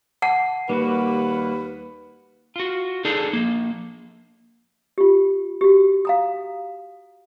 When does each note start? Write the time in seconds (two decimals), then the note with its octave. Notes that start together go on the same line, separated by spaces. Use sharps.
0.22 F#5 A5
0.69 D#2 G3 A#3 F#4 B4
2.56 F4 F#4
3.05 D4 D#4 G#4 A4
3.33 F3 A#3
4.98 F4 G4
5.61 F#4 G4
6.05 F5 A#5 D#6